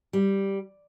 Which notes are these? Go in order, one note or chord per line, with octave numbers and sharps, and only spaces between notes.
G3